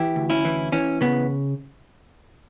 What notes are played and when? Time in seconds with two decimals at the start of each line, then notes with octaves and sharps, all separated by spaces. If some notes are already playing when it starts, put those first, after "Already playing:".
Already playing: E3 E4 G4
0.16 D2
0.30 C#4 E4
0.45 E3
0.72 E3 C#4
1.01 C#3 B3